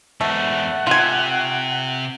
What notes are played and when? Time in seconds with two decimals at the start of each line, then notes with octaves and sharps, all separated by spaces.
0.21 E2 G#2 A3 F#5
0.87 C3 F4 G#5